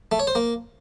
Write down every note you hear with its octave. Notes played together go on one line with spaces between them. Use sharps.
A3
C#5
C5
A#3